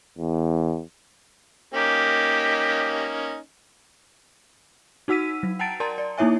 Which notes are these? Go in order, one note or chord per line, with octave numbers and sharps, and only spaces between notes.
E2
A#3 C#4 D#4 G4
D#4 F#4 F#5 E6 B6 D#7
F#3
F#5 G5 A5 A#5 A6 D7
A#4 D5 A5 A#5 C6
D5
A#3 D#4 E4 C#5 E5 G#5